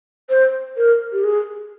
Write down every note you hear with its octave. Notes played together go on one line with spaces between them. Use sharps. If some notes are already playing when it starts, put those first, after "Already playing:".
C5
A#4
G4
G#4